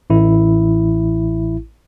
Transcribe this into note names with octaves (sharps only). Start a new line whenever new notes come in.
A1 E4